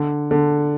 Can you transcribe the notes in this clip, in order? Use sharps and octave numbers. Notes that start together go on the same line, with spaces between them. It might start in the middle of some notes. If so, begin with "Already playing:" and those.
Already playing: D3
D3